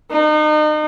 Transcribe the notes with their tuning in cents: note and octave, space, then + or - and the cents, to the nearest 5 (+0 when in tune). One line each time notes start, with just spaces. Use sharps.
D#4 -35